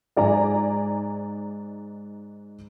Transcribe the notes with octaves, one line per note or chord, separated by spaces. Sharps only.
G#2 D5 G#5 A#5